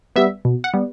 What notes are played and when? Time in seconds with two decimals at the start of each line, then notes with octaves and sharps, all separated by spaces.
0.16 G3 B3 E5
0.45 B2
0.64 F#5
0.74 G3 B3